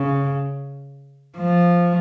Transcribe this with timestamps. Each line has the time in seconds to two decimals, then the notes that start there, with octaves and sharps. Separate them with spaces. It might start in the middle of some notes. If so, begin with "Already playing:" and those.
Already playing: C#3
1.37 F3